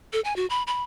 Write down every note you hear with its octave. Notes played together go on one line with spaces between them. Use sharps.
A4
G#5
F#4
B5
B5